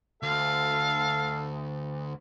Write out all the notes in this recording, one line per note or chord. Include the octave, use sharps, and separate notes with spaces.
D2 A4 F5